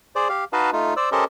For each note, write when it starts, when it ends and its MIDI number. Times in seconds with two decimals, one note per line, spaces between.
0.16 0.28 68
0.16 0.28 72
0.16 0.28 74
0.29 0.44 67
0.29 0.44 77
0.53 0.70 63
0.53 0.70 66
0.53 0.70 71
0.53 0.70 75
0.53 0.70 77
0.53 0.70 81
0.73 0.94 57
0.73 0.94 63
0.73 0.94 65
0.97 1.09 72
0.97 1.09 74
0.97 1.09 88
1.12 1.24 61
1.12 1.24 67
1.12 1.24 69
1.12 1.24 70
1.12 1.24 72
1.12 1.24 75